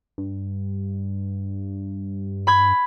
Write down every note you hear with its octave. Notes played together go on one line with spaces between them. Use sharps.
G2
B5 G#6